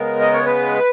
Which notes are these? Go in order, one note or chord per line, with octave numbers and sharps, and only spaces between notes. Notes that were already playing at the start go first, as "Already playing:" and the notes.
Already playing: C#3 G#3 B3 A#4
D#5
C#5
B4